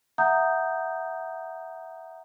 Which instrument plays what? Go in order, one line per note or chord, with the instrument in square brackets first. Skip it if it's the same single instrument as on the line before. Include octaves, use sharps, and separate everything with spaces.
[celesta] E5 F#5 A#5 D#6 G6